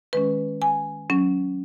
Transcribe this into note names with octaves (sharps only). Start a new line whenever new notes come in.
D#3 G#3 C#4 B4
G#5
F#3 C#4